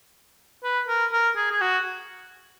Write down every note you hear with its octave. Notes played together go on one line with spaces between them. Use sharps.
B4
A#4
A#4
G#4
G#4
F#4